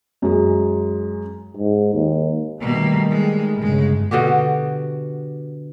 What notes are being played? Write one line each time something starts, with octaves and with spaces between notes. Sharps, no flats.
F#2 G#3
G#2
D#2
B2 D#3 G3 A3 A#3
G#3
G1 C#3 G#3
B2 D3 F#4 G4